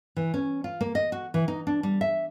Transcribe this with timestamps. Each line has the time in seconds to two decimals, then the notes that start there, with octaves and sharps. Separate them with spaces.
0.16 E3
0.34 C#4
0.64 F4
0.81 A#3
0.95 D#5
1.12 F#4
1.34 E3
1.48 D#4
1.67 D4
1.83 G3
2.01 E5